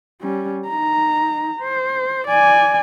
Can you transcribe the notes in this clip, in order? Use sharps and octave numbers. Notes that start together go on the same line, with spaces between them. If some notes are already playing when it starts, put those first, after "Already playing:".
G3 C#4
D#4 A#5
C5
D5 G#5